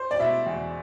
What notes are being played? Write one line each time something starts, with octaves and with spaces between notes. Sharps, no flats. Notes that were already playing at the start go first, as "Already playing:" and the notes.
Already playing: C5
D5
B2 E4 E5
E2